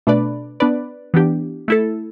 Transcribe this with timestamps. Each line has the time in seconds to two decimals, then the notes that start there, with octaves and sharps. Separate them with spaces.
0.07 B2 A3 D4 B4 D5
0.60 B3 D4 B4 D5
1.14 E3 B3 D4 G4
1.68 A3 E4 A4